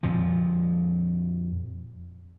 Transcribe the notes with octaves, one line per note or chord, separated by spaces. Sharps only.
F2 A#2 F3